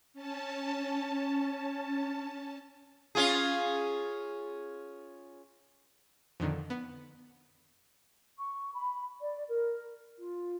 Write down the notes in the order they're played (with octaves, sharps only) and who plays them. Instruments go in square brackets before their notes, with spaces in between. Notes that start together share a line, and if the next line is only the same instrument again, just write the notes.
[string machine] C#4 A5
[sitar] C#4 F4 G#4
[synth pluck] F2 A#2 D3 D#3
B3
[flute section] C#6
B5
D5
A#4
F4